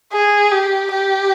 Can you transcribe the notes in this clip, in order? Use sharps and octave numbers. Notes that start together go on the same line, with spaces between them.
G#4
G4
G4